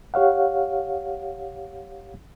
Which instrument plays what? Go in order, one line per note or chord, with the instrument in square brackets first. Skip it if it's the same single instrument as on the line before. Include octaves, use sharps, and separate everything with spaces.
[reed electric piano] G4 C#5 F5 F#5